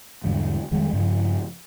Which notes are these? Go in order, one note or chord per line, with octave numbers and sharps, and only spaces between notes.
E2 G#2 D3 G3
F2 D#3 G3 G#3
G2 C#3 F3